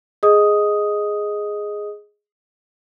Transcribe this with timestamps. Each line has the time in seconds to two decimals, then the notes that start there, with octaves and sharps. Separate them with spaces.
0.23 G#4 D#5 D#6